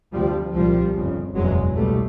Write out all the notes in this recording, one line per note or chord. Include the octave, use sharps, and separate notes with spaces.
D2 C3 F3 G3
C2 A#2 F3 G3
G1 F2 C#3
F#1 E2 B2 F#3 G#3
C2 B2 G3 A3